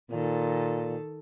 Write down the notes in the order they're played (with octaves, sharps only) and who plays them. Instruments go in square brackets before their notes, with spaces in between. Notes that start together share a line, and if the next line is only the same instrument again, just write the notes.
[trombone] A#2 [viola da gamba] D#3 A4